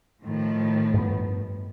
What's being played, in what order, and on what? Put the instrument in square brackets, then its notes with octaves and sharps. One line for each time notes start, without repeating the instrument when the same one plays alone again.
[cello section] A2 D#3 F3
[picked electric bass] G2 B3